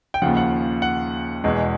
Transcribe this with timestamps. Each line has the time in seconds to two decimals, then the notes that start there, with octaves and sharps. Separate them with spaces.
0.14 G5
0.22 D#2 C#3 F3 F#5
0.37 F#5
0.82 F#5
1.44 E2 B2 G#3